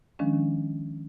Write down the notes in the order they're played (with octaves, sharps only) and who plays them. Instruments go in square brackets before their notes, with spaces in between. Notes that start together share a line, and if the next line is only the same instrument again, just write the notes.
[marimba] D#3 F3 G#3 C#4 D4